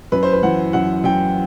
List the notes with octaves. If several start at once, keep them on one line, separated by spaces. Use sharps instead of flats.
F#2 B4
C5
B4
E3 F#5
F#2 F#5
F#2 G5